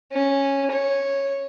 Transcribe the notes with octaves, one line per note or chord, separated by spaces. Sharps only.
C#4
C#5